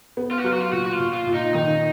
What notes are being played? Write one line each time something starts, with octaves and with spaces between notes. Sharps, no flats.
B3
F4
F#4
F#3 F4
F#4
F4
A#2 F#4
F#4
F4
A#2
F4
A#2
D#4
D#3 D#4